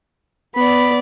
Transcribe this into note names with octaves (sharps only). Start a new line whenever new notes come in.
B3 D5 B5